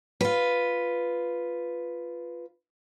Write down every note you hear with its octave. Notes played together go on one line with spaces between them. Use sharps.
F4 B4